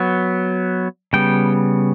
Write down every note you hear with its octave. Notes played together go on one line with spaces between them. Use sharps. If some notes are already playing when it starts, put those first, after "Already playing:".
Already playing: F#3 B3
C#3 G3 B3 G5